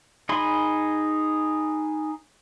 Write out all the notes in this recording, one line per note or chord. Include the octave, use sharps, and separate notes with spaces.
D#4 G#4 B5 C6